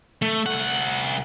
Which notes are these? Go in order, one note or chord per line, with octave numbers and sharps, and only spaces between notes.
A3
C2 F#5